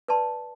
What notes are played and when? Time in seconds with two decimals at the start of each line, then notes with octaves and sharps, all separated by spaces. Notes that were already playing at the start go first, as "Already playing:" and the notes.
0.08 B4 D5 A5 C6